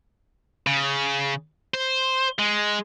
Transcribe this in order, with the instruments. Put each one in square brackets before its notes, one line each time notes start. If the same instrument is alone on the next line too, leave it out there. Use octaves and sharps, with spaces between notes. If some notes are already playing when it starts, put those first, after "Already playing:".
[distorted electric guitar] C#3
C5
G#3